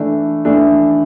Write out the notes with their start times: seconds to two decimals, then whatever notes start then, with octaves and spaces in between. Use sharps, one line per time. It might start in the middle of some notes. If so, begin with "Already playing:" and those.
Already playing: E3 A3 D4
0.45 E3 A3 D4